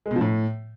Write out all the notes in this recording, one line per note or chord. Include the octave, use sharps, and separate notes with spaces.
G#3
B2
F3
A2